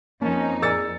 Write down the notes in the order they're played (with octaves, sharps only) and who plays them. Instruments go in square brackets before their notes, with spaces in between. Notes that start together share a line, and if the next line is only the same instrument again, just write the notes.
[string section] F2 D#4 [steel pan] A#3 A5 [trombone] C#4
[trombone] G#4 [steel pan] A#4 D5 G#5 [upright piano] E6 A6 C#7